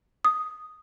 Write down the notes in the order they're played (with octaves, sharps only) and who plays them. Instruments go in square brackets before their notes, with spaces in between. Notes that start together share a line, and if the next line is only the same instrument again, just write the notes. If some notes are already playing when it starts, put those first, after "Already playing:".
[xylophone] D#6